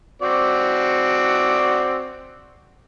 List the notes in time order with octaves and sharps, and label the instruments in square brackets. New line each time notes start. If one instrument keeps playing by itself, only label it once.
[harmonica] C4 F#4 D5